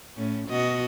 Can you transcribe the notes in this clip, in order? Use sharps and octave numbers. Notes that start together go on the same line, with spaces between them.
A2 C#4
B2 F#4 D#5